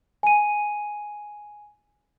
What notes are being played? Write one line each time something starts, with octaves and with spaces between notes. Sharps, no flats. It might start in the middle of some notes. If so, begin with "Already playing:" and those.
G#5 D#7